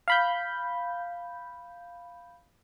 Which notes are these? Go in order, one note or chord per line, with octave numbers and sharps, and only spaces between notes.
F5 B5 G6